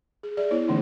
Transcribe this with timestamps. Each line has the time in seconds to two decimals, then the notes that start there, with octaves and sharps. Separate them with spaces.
0.23 G#4
0.37 G#4 D5 E5
0.51 B3 E4 C#5
0.68 D3 E3 A3 C#4 D#4